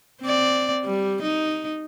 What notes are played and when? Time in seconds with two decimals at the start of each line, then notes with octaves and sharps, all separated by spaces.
0.21 C4 D5
0.84 G3
1.22 D#4